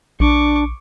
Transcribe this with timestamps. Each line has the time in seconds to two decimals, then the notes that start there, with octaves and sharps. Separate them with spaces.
0.20 A#1 D4 C#6 D6